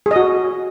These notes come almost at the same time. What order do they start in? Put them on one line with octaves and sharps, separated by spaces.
G#4 D#5 F#4